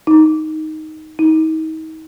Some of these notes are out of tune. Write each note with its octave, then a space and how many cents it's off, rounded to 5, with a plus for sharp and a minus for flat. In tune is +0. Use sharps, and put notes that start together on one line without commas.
D#4 +5
D#4 +35